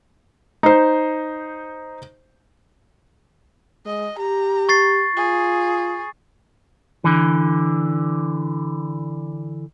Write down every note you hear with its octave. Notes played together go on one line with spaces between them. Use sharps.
D#4 C5
G#3 D#5
G4 A#5
C#6 A6 C7
F4 G#4
D3 E3